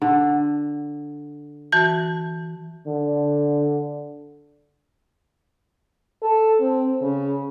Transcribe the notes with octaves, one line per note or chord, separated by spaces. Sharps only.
D3
E3 F#4 A5
D3
A4
C4
C#3